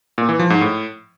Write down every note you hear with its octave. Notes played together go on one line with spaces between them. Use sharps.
A#2
E3
F3
G#2
A2